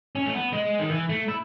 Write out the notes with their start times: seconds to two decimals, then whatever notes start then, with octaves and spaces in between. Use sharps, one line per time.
0.15 C#4
0.26 A3
0.34 B3
0.53 G#3
0.79 D#3
0.91 E3
1.09 A3
1.28 E4